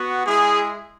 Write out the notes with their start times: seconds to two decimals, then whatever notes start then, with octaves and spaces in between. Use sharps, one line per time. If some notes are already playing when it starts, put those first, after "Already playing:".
Already playing: B3 F#4
0.26 G#3 E4 G#4